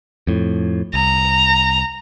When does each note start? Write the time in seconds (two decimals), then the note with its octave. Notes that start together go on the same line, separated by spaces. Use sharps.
0.27 F2 A2
0.94 C2 A#5